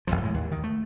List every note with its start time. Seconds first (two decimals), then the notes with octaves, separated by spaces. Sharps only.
0.07 F#1 C2 F2 F3
0.21 A2 E3 F#3 G#3
0.34 D#2
0.52 D#3
0.64 A3